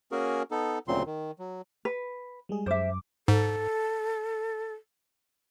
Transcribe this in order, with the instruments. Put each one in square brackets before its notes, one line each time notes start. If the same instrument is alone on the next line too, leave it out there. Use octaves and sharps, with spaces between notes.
[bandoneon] A#3 C#4 F#4 G#4 A#4
B3 D#4 A4
D2 A#2 C#3 F#3 C4 C6
D#3
F#3
[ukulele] B4
[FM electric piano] G3 G#3 G#4
[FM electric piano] F#2 D6 [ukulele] C5 E5
[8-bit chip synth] G#2 [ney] A4